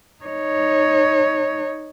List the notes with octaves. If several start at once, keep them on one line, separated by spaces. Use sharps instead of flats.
D#4 C#5